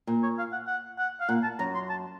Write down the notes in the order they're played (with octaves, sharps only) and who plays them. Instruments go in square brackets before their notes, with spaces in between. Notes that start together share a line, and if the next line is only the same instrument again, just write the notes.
[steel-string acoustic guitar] A#2
[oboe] C#5
F5
F#5
F#5
F#5
F5
[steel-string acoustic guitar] A#2 [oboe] F#5
[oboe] A5
[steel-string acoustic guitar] F#2 [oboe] A#5
[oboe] C6
A5